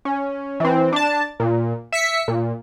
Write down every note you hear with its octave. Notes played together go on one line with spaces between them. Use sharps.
C#4
E3 C4
D4 A5
A#2
E5 B6 C#7
A#2